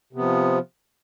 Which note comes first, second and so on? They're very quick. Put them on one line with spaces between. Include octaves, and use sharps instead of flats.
C3 B3 F3